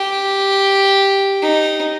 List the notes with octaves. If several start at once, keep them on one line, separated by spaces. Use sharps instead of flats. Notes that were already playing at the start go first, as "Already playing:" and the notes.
Already playing: G4
D#4